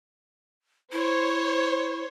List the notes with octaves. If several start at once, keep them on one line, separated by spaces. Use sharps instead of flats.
E4 C5 C#5